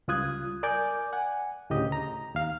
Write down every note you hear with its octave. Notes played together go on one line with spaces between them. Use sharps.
C#2 G3 F4 D#6 F#6 G#6
A#4 D5 G#5 D6 G6
F#5 G#5
D2 A2 C#3 G4 D#5
A#5
D#2 F5